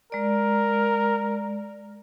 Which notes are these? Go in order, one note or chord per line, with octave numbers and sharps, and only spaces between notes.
G#3 A#4 D5